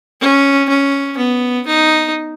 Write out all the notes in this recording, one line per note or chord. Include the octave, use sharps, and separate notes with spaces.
C#4
C#4
B3
D#4